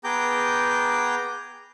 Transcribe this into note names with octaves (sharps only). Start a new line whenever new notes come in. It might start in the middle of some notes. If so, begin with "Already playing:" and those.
B3 G#4 G5 A#5 D6 G6